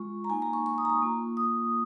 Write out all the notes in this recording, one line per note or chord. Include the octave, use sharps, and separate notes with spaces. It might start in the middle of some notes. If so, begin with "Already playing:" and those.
Already playing: G#3 F4 C#6
A#5
A#3 D#4 G#5
A#5
C#6
C#6
D#6
A#5
C#6
A#3 F4
D#6